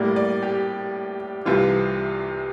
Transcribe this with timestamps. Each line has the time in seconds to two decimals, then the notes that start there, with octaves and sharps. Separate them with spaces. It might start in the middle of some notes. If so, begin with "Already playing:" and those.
Already playing: A2 G3 A#3 D5
0.16 D5
0.42 G4
1.45 C2 C3 E3 F4